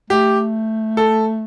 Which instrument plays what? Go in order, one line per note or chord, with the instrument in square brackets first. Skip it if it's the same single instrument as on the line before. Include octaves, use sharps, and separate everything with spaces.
[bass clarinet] A3 [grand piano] G4
[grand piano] A4